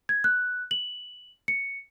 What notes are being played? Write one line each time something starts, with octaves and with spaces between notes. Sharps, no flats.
G#6
F#6
F#7
C#7